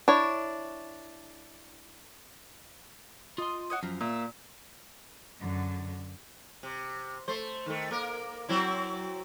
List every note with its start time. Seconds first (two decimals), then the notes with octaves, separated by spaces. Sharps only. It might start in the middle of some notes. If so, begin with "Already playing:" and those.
0.08 D4 E4 C#5
3.38 F4 D#5 C6
3.70 F#4 C#5 D#5
3.83 F#2 F3 A#5
4.01 A#2 A#3 E5
5.40 F#2 D3
6.63 C3
7.28 A3 C5
7.66 D#3 A3
7.91 A#3 A#4
8.49 F#3 C4 E4